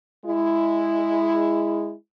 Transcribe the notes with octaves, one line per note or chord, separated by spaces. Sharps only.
G#3 E4